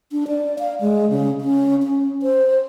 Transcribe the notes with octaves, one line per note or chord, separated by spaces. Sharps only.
D4
D5
F5
G#3
C#3
C#4
C#4
C5